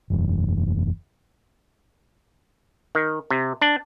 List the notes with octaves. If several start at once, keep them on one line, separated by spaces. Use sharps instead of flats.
F#1 E2
D#3
C3
D4